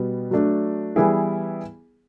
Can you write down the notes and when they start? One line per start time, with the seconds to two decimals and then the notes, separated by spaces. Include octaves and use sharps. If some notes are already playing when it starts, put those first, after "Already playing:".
Already playing: B2 G3 B3
0.31 F#3 A3 D4
0.96 E3 G3 B3 E4 G#4